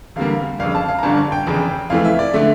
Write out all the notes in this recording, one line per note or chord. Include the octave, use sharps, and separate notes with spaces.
E2 D3 G3 A#3 F5
G1 F2 C#3 F5
A5
F5
A#5
G1 G2 D3 A5
G5
F1 E2 C#3
F2 E3 A3 F5
E5
D5
D3 A3 E5